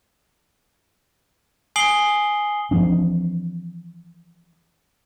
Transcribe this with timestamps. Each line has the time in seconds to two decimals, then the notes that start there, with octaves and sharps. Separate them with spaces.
1.76 G#5 D#6 C7 F#7 G7
2.71 E3 F3 C4 D4